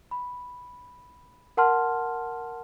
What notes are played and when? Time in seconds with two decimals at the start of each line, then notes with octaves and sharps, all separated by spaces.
0.11 B5
1.57 A#4 F#5 A5 C6 F6